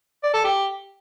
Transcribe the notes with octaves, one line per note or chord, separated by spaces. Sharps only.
D5
A4
G4